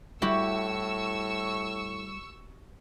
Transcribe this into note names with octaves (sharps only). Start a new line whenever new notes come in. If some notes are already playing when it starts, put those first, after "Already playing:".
A2 G3 E4 F#4 G4 C#6 E6